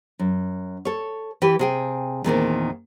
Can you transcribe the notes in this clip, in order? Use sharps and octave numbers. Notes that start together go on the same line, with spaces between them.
F#2
A4 C#5
E3 G4 B4
C3 G#4 G5
E2 A#2 D#3 C4